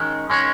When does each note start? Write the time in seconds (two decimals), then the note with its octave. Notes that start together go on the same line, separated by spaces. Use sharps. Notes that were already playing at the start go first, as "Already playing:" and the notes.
Already playing: D#3 G#3 C#4
0.30 D#3 G#3 C#4